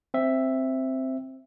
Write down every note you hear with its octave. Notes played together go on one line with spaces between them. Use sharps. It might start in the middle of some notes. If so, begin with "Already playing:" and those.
C4 E5